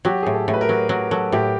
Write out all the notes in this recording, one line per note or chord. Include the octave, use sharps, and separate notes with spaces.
F#3 G4
A2 G#4
A4
A2
B4
A#4
F#3
F#3 A#4
F#3 A4
A2 G4